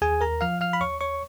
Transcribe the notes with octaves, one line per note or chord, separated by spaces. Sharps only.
D#2 G#4 G#5
A#4 A#5
F3 F5 F6
F5 F6
B5
D#2 C#5 C#6
C#5 C#6